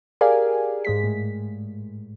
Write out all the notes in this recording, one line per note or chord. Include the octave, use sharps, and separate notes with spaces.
G4 G#4 A#4 D5 F5 G#5
G#2 G#3 B6
A2